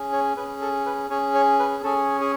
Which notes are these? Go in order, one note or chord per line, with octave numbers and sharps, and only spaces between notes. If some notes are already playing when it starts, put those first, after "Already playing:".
Already playing: C#4 G#4
C#5
C#4 G#4 B4
A4
B4
C#4 G#4 C#5
C#5
B4
C#4 G#4 A4
G#4